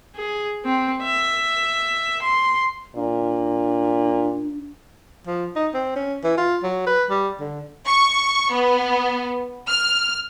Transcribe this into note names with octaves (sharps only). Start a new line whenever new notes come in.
G#4
C4
E5
C6
A#2 D4
F3
D#4
C4
C#4
E3
F4
F#3
B4
G3
D3
C#6
B3
F6